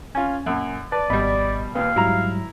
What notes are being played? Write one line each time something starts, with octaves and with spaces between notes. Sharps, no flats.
C#4 F4 G#5
F#2 A#2
B4 D5 A5
G#1 B2 G3 D#5 B5
D#2 A#2 B4 F5
G#2 F#3 G3 E4 A#5